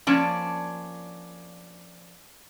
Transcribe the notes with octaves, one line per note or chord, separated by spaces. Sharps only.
F3 A#3 C#4 D4 D5 A5